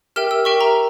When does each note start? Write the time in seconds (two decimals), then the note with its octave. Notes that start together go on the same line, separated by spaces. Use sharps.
0.16 G4 A#4 E5 G5 F6
0.31 E6
0.45 G4 A#4 E5 G5 C#6
0.61 A#5